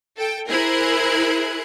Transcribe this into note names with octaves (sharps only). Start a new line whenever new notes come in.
A4 G5
E4 G#4 A#4 C5 F#6 G#6